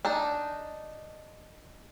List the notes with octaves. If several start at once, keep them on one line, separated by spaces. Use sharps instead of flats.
D4 D#4 A5